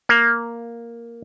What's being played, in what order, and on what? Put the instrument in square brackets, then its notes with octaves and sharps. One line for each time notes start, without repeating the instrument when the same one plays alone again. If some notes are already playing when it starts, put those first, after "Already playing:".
[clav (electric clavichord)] A#3